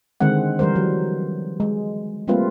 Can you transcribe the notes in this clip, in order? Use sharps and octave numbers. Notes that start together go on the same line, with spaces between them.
D3 D#3 G#3 C4 F#5
E3 G3 A#4 C5
F#3
G#3
G3 A3 A#3 C4 F4 B4